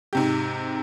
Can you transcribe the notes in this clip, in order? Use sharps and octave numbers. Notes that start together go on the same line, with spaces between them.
G#2 C3 G4